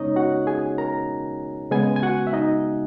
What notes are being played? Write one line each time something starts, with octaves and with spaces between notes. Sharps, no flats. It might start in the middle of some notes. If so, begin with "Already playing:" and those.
Already playing: C#3 G#3 B3 C#4 D#4 C#5 D#5
F#4 F#5
G#4 G#5
A#4 A#5
C#3 G#3 B3 G#4 G#5
G#5
F#4 F#5
E5
D#4 D#5